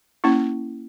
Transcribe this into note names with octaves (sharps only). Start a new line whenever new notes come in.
A#3 C#4 E4